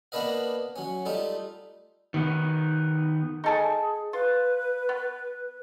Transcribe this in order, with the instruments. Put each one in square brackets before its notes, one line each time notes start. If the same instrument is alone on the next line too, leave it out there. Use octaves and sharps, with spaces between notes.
[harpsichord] A#3 B3 D4 B4 D#5 F5
F#3 C#4
G3 A3 D#4 F4
[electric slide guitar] D#3 B3
[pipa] D#4 A4 G#5 [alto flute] G#4
[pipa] F4 [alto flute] B4
[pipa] B3